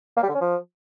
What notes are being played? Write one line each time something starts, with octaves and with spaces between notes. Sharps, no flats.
A#3
G3
D3
C#4
F3